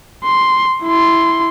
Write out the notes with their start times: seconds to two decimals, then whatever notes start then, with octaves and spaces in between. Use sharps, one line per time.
0.25 C6
0.83 E4 C6